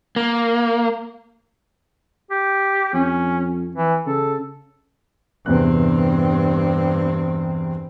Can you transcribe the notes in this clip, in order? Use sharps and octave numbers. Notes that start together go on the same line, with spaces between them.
A#3
G4
F2 C#4
E3
C#3 A4
E2 G2 C3 C4 F#6